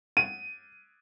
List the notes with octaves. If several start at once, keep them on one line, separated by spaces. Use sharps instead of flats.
D#7